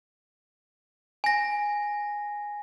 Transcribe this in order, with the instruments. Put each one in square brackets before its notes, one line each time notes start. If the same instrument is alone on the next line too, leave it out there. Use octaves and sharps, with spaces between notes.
[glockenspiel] G#5 A#6